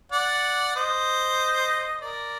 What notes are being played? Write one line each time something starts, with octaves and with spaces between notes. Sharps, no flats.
D5 F#5
C5 D#5
A#4 D5